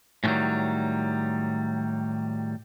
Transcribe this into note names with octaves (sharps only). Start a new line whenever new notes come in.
A2 D3 D#3 F#3 G3